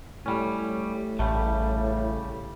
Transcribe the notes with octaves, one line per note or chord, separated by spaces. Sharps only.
A2 G3 C#4
A1 C#3 G3 A3